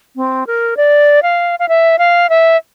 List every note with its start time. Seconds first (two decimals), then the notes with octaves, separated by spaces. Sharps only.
0.16 C4
0.47 A#4
0.77 D5
1.23 F5
1.59 F5
1.69 E5
1.99 F5
2.30 E5